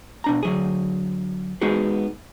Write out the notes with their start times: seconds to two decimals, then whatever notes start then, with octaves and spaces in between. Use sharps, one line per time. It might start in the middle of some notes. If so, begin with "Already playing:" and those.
0.24 B2 D4 A#5
0.43 D3 F#3 G#4
1.61 G#3 B3 D#4 F#4 G#4